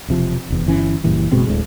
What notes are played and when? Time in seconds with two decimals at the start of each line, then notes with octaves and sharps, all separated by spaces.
0.08 E1 C3 F3
0.50 F1 E2
0.66 G1 E3 C#4
1.04 F#1 A#2 E3 G3
1.32 F#1 B2 G#3 C4
1.46 D1 D2 A2 G#3